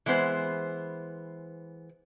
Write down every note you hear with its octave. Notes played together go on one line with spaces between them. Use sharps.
E3 G#3 B3 C5